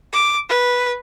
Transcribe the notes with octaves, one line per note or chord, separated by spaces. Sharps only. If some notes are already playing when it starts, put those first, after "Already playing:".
D6
B4